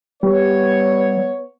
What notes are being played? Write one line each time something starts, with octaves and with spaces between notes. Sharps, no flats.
G3 B3 C#5